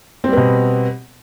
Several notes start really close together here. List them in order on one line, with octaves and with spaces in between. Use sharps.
C4 G3 B3 B2